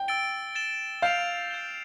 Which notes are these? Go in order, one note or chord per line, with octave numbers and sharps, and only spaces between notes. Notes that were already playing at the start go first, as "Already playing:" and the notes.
Already playing: G5
E6 A6 D7 G7
A6 E7 G7
F5 G6 D7 F7
G6 C7 E7 G7